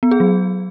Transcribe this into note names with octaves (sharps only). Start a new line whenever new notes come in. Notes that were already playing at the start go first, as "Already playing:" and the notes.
B3
G#4
F#3